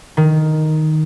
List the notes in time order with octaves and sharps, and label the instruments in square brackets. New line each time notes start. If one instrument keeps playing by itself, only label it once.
[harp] D#3